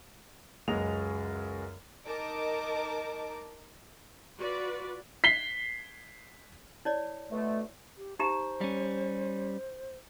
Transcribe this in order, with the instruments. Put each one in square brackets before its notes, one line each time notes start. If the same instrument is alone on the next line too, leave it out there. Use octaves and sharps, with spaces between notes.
[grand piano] C#2 F#2 F#3 G#3 D#5 F7
[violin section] D#4 A#4 D#5 A5 A#5 D6
[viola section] F4 F#4 B4 D5
[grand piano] B6 C7 G7
[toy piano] E4 C#5 D5
[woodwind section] B2 D3 A3
[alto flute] G4
[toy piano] D#4 G4 A#5 [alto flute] C5
[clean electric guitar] G3 C#4